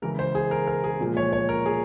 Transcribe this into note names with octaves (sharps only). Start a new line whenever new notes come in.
C#3 E3 G#3 A#4
C5
G#4
A#4
A#4
G#4
A#2 F3 G#3
C#5
C#5
A#4
G#4